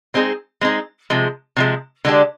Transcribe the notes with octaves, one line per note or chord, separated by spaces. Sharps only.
G#3 C4 D#4 G#4
G#3 C4 D#4 G#4
C3 F3 G#3
C3 F3 G#3
D3 G#3 D4 G4